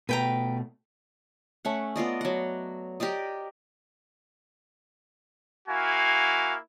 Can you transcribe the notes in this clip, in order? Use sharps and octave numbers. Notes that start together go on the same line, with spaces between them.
B2 A3 B4 G5 A#5
A3 C#4 F#5
B3 F4 D5 D#5
F#3 F#5
G4 A#4 D5 D#5
A#3 E4 F#4 F5 G#5